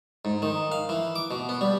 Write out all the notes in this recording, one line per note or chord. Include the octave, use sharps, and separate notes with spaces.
G#2
D#3
F5
E3
D6
B2
B3
G3